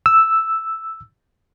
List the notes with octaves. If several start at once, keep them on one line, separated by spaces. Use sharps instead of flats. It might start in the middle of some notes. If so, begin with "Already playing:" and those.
E6